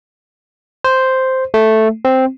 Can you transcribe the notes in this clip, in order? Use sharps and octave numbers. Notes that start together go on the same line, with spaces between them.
C5
A3
C4